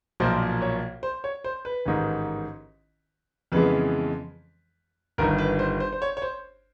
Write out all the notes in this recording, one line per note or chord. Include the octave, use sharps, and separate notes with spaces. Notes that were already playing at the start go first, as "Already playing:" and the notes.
B1 A#2 F3 A#3 C5
C#5
C5
C#5
C5
B4
A1 G#2 D#3
F2 C#3 E3 G#3 B3 B4
G1 G2 D#3 A#4
B4
C5
C5
C5
C#5
C#5
C5